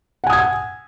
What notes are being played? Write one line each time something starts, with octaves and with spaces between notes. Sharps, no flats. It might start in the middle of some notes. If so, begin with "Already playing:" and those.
F#5 G#5 D#6 G#6